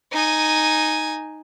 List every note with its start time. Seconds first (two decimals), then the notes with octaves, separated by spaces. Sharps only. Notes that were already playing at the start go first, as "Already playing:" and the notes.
0.12 D#4 G#5